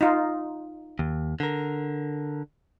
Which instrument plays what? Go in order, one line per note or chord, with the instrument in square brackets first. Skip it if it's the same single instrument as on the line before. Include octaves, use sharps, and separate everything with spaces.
[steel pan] D#4 F4
[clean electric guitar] D#2
D3 A#4